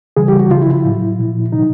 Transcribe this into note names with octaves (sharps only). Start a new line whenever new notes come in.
C#3 E3 G3 G#4
G4
F#4
C#3 F3 F4
E4
E4
A2 F#3
A#2 F3
C3 D#3 F#3 D#4